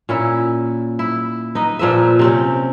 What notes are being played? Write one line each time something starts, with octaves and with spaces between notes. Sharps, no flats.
A#2 C#4 E4
E4
D#4 B4 D#5
A#2 F3 B4 E5
C3 C4 C#4